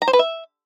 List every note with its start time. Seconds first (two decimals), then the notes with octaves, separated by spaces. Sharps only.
0.02 A#5
0.08 C5
0.13 B4
0.19 E5